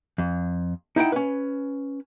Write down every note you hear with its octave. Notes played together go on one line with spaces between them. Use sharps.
F2
D#4 E4 F#5 G5
C#4 B4